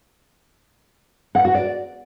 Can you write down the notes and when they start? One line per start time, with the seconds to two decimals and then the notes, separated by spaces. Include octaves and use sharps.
1.35 F#5
1.45 F#4
1.54 D5